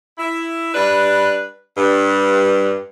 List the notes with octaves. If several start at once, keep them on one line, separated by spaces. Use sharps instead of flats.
E4
G3 D4 B4
G2